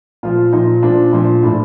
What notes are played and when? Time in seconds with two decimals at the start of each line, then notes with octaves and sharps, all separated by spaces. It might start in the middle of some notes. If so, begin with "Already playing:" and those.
0.23 A#2 F3 F4
0.53 A#2 F3 D#4
0.83 A#2 F3 D4
1.13 A#2 F3
1.43 A2 F3 D4